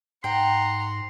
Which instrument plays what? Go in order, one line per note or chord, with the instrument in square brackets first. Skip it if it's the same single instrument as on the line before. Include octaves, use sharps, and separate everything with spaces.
[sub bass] G#2 [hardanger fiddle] F#5 A#5 [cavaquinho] G5 [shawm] C6